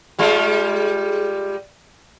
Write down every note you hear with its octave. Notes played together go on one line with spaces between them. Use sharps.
G3 G#3 F4